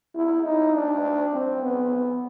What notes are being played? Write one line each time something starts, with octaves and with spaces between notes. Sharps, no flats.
E4
D#4
D4
C4
B3